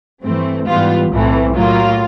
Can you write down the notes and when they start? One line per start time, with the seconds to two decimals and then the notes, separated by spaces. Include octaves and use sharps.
0.23 G2 E3 A3 C4
0.67 G#2 E3 G3 B3 F4
1.10 B1 A2 E3 A3 C4
1.54 A2 F#3 A#3 F4